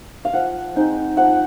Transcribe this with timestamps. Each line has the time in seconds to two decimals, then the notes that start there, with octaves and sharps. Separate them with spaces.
0.25 F5
0.33 F3 F#5
0.76 G#3 C4 D#4
1.17 F3 F#5